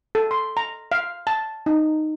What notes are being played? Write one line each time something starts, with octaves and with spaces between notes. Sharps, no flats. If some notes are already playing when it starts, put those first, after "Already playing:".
A4
C6
A#5
F5
A5
D#4